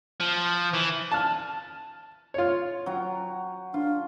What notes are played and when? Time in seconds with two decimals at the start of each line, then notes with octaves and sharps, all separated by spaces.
0.20 F3
0.74 E3
1.12 A5 F6
2.34 F4 C#5
2.86 F#3 G5 A#5
3.74 D4 F4